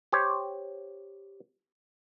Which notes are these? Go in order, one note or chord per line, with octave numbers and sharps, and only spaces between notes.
G4 C5 C#5